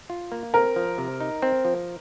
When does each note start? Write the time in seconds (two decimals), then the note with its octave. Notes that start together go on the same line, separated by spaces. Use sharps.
0.10 F4
0.32 A#3
0.54 C4 A#4
0.76 F3
0.98 C3
1.20 D#4
1.42 C4
1.65 F3